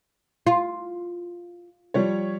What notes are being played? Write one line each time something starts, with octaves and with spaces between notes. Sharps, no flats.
F4
F3 G3 C#5